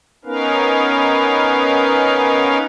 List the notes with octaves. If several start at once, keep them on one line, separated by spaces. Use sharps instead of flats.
B3 C#4 D#4 A#4 B4 F5